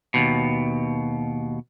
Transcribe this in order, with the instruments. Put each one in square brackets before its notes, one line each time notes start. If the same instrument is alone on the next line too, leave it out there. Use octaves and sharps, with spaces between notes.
[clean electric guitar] D#2 B2